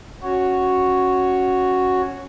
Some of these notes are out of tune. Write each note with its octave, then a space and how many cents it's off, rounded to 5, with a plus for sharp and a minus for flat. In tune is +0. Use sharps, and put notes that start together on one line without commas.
C#4 +0 F#4 +0 C#5 +0